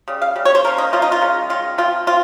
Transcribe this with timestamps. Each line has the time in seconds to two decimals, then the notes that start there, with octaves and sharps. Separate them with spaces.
0.08 C#3 G3
0.22 F5
0.36 C#3 G3
0.45 C#5
0.55 C5
0.65 F3 A#3 C#4 A#4
0.78 D#4
0.93 F3 A#3 C#4 F4
1.02 D#4
1.12 F4
1.21 D#3 G#3 C#4
1.50 D#3 G#3 C#4 F4
1.78 F3 C4 F4
2.07 C4 F4